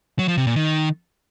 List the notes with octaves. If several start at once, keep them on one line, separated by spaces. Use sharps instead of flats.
F#3
F3
C3
A#2
D#3